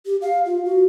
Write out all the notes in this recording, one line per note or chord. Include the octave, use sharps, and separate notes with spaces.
G4
F5
F4
F#4